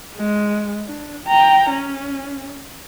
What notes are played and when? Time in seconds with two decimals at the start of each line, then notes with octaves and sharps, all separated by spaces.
0.16 G#3
0.87 D4
1.26 G5 A#5
1.70 C#4